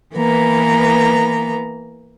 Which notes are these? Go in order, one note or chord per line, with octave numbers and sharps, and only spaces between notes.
E3 A#3 B3 A#5